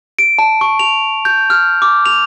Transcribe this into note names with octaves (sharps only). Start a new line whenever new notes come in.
D7
A5
C#6
F7
G6
F6
D6
F7